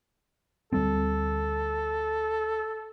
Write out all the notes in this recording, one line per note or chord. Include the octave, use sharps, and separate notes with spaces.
D2 G3 C4 A4